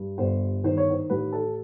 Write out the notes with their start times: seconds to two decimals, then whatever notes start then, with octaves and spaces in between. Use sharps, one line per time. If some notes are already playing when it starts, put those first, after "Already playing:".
Already playing: G2
0.18 G1 C5
0.64 D#3 C5
0.77 C#5
0.90 C5
1.10 A1 B4
1.32 A4